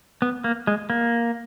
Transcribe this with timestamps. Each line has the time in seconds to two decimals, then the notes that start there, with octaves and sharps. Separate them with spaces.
0.22 B3
0.44 A#3
0.67 G#3
0.90 A#3